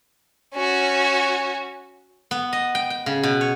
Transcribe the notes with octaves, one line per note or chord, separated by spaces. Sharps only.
C#4 F#4
B3
D#5
G5
G5
C#3
B2
C#5